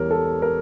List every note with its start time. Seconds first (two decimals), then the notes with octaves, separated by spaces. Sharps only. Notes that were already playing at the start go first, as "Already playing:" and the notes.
Already playing: E2 E3 G3 A#4 C#5
0.11 A4
0.42 A#4